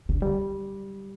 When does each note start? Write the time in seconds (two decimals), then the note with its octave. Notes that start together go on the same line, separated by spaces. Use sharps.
0.09 D3
0.22 G3